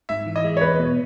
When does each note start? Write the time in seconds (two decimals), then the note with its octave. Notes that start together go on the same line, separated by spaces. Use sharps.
0.09 G#2 E5
0.26 E3
0.36 D#5
0.44 G#3
0.57 C#5
0.61 E2 B4
0.79 B2